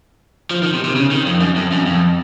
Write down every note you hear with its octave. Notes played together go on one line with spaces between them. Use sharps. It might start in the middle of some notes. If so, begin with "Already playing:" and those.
F3
D#3
C3
C3
C#3
D#3
F2
F#2
F2
F#2
F2